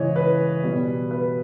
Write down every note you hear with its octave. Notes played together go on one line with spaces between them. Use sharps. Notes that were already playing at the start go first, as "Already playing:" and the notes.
Already playing: C#3 E3 G#3 C#5 D#5
B4
B2 G3
B4